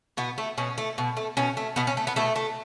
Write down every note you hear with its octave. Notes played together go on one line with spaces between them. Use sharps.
B2 B3
A3
B2 C#4
A3
B2
A3
B2 C#4
A3
B2 B3
C#4
A3
B3
B2 A3
A3